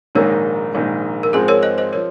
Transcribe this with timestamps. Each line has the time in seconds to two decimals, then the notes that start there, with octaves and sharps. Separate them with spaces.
0.15 A#1 G#2 D#3 A#3 A#4 C#5
0.75 A#1 G#2 D#3 A#3
1.23 A#4
1.33 G#1 G#2 F3 G#3 C4 G#4 C5
1.48 A#4 C#5
1.63 C5 D#5
1.78 C5 D#5
1.93 F3 A#4 C#5